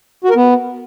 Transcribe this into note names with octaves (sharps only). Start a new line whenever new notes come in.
F#4
A#4
B3